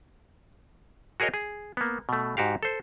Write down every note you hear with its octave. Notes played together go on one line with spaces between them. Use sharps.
F#4 G#4 A#4 C#5 D#5
G#4
A#3 B3
B2 A3
G#2 F#4 G4 F5
A4 C5